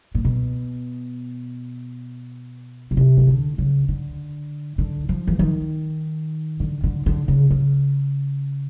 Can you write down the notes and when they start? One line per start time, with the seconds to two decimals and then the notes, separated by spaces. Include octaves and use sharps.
0.15 A#2
0.25 B2
2.91 B2
2.97 C3
3.17 D#3
3.27 D3
3.58 C#3
3.89 D3
4.78 D3
5.09 F3
5.27 E3
5.39 D#3
6.60 D3
6.84 D3
7.06 D3
7.28 C#3
7.50 C#3